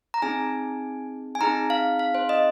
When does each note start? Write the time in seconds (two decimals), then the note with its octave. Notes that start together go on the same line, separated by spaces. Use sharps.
0.14 A#5
0.22 C4 D#4 G#4 G#5
1.35 G#5
1.41 C4 D#4 G#4 A#5
1.70 F5
1.99 F5
2.15 C5
2.29 D#5